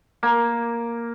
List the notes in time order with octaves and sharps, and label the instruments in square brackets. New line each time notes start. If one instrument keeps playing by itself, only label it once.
[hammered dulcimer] A#3